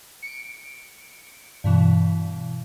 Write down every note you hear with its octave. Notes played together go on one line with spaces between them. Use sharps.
C#7 D7
G2 B2 E3